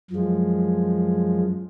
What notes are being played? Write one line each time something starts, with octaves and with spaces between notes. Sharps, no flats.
F#2 F3 G#3